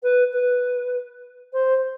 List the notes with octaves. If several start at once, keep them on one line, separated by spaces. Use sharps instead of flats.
B4
B4
C5